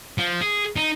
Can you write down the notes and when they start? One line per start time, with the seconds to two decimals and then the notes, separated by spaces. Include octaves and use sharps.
0.18 F3
0.41 G#4
0.76 D#4